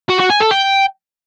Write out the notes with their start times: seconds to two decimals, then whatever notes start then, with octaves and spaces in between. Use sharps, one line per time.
0.09 F#4
0.19 F#4
0.30 G#5
0.40 A4
0.51 G5